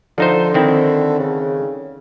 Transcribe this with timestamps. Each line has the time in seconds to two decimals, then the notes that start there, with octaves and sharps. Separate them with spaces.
0.18 D3 F3 D#4 C5
0.54 D#3 C4 E4
1.19 C#3